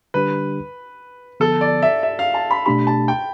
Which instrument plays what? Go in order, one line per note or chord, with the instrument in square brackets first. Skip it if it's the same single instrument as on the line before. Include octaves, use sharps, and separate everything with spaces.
[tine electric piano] D3 G3 D4 G4 [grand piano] B4
[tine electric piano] D3 F3 B3 [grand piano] A4
[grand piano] D5
E5
E5
F5
A5
B5
[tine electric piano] B2 A3 D4 G4 [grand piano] B5
[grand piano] A5
G5